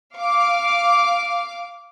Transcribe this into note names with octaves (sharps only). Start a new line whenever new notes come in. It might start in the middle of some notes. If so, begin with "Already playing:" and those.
F5 D6